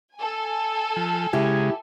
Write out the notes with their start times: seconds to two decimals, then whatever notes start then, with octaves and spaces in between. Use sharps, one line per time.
0.16 A4 G#5
0.96 F3
1.33 C#3 G#3 E4 G4